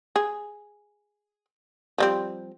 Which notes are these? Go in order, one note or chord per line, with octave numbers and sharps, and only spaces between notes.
G#4
F3 G3 C4